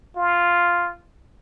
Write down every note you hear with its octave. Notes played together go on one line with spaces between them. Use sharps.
F4